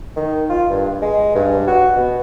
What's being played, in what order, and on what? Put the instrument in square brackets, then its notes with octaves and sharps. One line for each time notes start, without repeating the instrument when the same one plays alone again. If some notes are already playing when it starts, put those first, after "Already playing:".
[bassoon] D#3
F4
G2
G#3
G2
F#4
B2